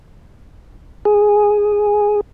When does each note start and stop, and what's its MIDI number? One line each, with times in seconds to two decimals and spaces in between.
1.05 2.21 68